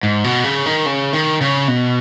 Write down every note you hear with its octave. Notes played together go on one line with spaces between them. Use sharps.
G#2
B2
C#3
D#3
C#3
D#3
C#3
B2